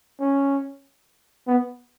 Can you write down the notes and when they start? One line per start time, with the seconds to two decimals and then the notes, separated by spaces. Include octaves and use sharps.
0.20 C#4
1.47 B3